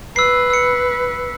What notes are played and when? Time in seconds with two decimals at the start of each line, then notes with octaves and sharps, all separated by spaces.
0.16 B4 E6 C7
0.50 E6 C#7